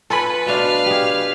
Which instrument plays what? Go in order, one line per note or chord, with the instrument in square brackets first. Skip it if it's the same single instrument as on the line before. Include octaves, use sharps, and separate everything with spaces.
[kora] F4 [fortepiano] A4 G#5 B5 [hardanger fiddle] B4
[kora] B2 A3 D4 [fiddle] F5 F6
[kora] G4 G#4